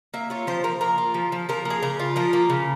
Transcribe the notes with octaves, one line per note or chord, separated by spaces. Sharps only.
A#3 E5
F4 C#5
F3 C5
F3 A#4
A#3 A#4
F4
F3
F3
F3 A#4
A#3
G#4
C#3 A#4
F4
F3 A#4
A#3
C#3